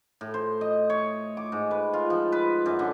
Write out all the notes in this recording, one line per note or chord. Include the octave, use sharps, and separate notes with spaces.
A2
C5
D#5
C#5
D6
G#2
B4
F4
F3
B4
F#2
D3